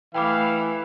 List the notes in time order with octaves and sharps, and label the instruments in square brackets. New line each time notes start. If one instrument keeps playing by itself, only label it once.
[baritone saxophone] E3 [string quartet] A3 E4 [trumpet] F5 [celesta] G5 B5 D6